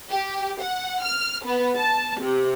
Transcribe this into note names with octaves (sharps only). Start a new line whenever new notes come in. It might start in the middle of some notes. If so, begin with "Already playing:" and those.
G4
F#5
F6
B3
A5
C3